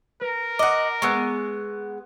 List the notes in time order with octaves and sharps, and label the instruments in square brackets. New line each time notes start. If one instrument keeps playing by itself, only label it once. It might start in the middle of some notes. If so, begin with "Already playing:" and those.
[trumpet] A#4 [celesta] B4
[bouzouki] D#5 F#5 [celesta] D6
[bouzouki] G#3 B3 [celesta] C#6 E6 F#6